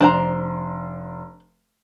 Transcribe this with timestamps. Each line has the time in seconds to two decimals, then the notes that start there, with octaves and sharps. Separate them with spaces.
0.01 F1 D4 C5 A#5 C6